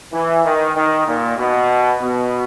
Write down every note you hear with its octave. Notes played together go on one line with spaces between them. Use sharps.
E3
D#3
D#3
A#2
B2
B2